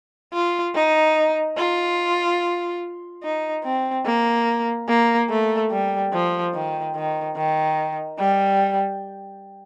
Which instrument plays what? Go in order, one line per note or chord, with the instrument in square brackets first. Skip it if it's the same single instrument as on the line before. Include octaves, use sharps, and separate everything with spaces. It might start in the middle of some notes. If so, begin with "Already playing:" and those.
[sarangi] F4
D#4
F4
D#4
C4
A#3
A#3
A3
G3
F3
D#3
D#3
D#3
G3